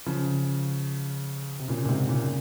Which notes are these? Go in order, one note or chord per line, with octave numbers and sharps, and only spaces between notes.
C#3 F3
C3
A#2 C#3
A#2
G#2 C3
A#2 C#3